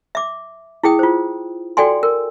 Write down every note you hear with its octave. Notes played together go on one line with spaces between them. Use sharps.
E5 D6
E4 G#4 G5 D#6
F4 C5
F#4 A4 D5 G5 G#5 C6
A#4